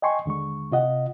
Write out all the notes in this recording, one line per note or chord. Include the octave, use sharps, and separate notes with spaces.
D#5 G5 G#5 C6 C#6
D#2 D3 G#3 C#6
C3 F4 D#5 F#5